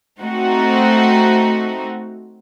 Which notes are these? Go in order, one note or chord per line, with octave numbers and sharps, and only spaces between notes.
A3 C4 D#4 F#4